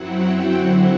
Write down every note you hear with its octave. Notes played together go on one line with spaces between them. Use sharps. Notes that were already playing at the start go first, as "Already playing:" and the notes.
Already playing: F#2 F#3 C4 E4 F#5
G5
D3 F#3 C4 E4 F#5